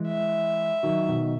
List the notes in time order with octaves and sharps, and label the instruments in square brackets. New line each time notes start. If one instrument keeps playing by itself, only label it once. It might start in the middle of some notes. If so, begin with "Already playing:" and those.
Already playing: [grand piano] E3 G#3
[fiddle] E5
[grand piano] D#3 F#3
B2 D#3